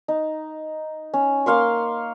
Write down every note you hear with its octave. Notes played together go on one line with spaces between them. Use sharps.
D#4
C#4
A#3 F5 C6 C#6